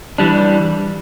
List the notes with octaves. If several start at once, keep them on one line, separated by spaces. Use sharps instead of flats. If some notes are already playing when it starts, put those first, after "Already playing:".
E3 G3 D4